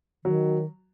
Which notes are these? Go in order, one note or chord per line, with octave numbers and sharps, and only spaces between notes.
D#3 F#3